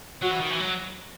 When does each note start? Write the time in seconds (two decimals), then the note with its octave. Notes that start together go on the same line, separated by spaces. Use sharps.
0.22 F#3 F#4
0.32 E3
0.41 D#3
0.50 E3
0.60 F#3